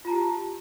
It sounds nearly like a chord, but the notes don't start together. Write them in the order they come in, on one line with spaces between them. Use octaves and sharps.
F4 A#5 A5 G4